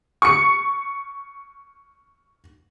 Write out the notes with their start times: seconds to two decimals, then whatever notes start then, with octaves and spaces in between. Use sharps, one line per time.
0.22 C#6 C#7